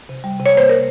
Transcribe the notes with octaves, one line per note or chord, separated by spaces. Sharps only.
C3
G3
C3
C#5
A#3 C5
C3 A#4